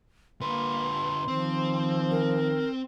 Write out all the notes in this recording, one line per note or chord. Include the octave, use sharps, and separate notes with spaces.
D3 A#3 B4 C6
D#3 F3 C4
A#4